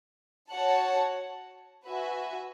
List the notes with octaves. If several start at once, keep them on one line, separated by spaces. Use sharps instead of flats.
F#4 C#5 F#5 A5
F#4 B4 E5 G#5